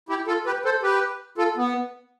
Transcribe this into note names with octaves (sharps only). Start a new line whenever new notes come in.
E4 G4
F4 A4
G4 B4
A4 C5
G4 B4
F4 A4
B3